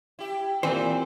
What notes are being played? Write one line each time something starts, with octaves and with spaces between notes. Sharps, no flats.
E4 G4
A#2 E3 G3 C4 C5